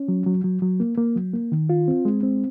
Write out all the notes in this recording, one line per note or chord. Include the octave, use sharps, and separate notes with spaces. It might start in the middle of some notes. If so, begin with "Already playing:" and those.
Already playing: C#4
F#3
F#3
F#3
F#3
A#3
A#3
F#3
A#3
D#3
F4
C4
G#3
C4